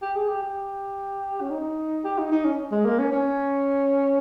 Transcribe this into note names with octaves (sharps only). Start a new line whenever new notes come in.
G4
G#4
G4
G4
C#4
D#4
G4
D#4
D#4
C#4
G#3
A#3
C#4
C#4